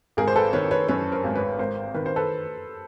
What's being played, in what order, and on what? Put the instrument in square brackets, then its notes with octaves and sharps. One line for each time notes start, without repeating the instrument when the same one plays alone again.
[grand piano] G#1 [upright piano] G#4 A#4
[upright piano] C5
A4 B4
[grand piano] D#3 [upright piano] B4 C#5
[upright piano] B4 C#5
[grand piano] F#2 [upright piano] B4 C#5
[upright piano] A#4 C5
[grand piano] G#1
[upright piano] B4 C#5
[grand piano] G#1 [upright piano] A#4 C5
[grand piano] D#3 [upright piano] B4
[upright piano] C5
A4 B4